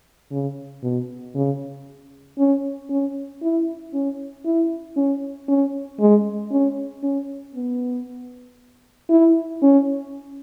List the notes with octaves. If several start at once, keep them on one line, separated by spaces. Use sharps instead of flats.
C#3
B2
C#3
C#4
C#4
E4
C#4
E4
C#4
C#4
G#3
C#4
C#4
B3
E4
C#4